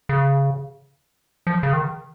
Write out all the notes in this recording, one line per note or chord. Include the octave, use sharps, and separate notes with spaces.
C#3
F3
C#3
D#3